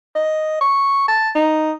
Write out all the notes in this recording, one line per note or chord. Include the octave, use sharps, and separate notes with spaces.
D#5
C#6
A5
D#4